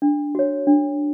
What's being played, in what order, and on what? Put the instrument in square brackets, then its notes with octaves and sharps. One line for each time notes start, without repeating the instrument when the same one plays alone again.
[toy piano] D4
F#4 C#5
D4